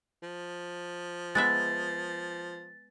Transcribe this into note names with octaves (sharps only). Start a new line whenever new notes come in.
F3
G#3 B3 E5 A6